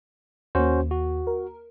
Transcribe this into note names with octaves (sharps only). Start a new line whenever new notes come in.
D#2 A#3 C#4 F#4 C5
F#4
A#4